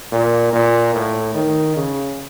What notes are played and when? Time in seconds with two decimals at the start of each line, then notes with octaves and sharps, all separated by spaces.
0.12 A#2
0.53 A#2
0.94 A2
1.35 D#3
1.76 C#3